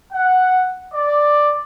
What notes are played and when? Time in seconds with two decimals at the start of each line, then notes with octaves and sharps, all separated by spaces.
0.12 F#5
0.94 D5